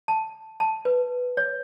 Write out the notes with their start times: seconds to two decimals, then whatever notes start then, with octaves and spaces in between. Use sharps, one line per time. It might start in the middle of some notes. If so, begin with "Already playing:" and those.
0.08 A5
0.60 A5
0.85 B4
1.37 C#5